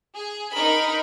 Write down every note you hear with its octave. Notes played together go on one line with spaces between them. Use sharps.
G#4
D#4 A#4 B5